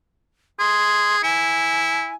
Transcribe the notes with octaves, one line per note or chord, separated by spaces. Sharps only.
G#4 C6
E4 G#5